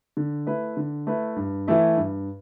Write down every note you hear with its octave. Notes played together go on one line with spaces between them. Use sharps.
D3
A3 E4 B4
D3
A3 E4 B4
G2
E3 A3 E4
G2